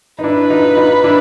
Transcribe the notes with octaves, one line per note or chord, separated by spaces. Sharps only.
D#4
D4 E4 B4
D#4 F4
D#4 F4
D4 E4